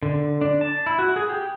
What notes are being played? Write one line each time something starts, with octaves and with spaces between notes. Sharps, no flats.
D3
D4
A5
E4
F#4
G#4
G4